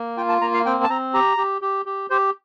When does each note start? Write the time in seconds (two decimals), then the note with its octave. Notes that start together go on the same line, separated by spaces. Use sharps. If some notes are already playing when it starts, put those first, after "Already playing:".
Already playing: A#3
0.17 F4 G5
0.29 A5
0.41 A#3 A#5
0.54 F5
0.66 C4 G5
0.83 A5
0.89 C4 A#5
1.14 G4 A#5
1.37 G4
1.62 G4
1.86 G4
2.10 G4 C5